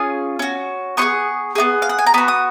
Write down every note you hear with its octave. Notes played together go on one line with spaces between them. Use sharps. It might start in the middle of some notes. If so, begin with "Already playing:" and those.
Already playing: C#4 F4 G#4 D#6
C#4 F#4
B3 F4 G#4 C#6
B3 D#4 G#4
F5
F#5
G#5
A#5
B3 F#4 B5
D#6